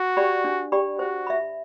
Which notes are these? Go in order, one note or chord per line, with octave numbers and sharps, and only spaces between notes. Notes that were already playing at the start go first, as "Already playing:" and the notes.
Already playing: F#4
G4 D5 G5 B5
D4
G4 D5 G5 B5
F#4 C5
E5 B5